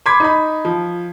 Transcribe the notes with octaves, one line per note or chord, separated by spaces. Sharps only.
B5 C6 D6 G#6 B6
D#4 B5
F3